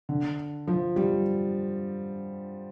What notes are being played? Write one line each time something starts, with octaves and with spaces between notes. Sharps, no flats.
D3
F3
G3